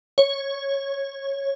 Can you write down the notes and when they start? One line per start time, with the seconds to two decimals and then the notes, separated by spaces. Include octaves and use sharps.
0.18 C#5